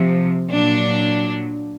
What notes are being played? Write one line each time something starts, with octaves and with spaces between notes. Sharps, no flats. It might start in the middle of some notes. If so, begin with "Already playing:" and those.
Already playing: C3 F3
A#2 F#3 D4